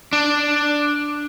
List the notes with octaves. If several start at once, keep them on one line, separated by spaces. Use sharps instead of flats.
D4